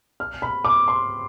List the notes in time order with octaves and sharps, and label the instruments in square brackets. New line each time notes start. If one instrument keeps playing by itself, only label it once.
[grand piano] F6
B5
D6
C6